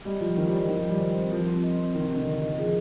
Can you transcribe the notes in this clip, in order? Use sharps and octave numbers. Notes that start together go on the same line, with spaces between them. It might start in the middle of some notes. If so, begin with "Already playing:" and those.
G3 D#5
F3 F4
D#3 C5
G3
D#5
F3
D#3 D#5
F3 D#5
G3
C5
C4
F3 A#4
C4
D#5
C4
D#3 A#4
C3
D3 D#5
D#3 D#5
D#3 D#5
F3 G#4